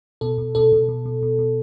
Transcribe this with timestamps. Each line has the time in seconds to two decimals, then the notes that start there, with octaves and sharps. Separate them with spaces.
0.21 B2 A4
0.38 B2
0.55 B2 A4
0.72 B2
0.89 B2
1.06 B2
1.23 B2
1.39 B2